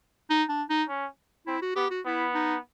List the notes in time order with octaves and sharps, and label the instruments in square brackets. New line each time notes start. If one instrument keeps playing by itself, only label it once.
[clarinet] D#4
D4
D#4
[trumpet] C#4
[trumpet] C4 [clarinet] E4
[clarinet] F#4
[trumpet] B3 [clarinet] G4
[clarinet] F#4
[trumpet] B3 [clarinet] E4
[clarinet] D#4